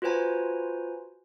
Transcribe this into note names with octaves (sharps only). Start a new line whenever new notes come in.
F4 F#4 B4 C5 G#5 A#5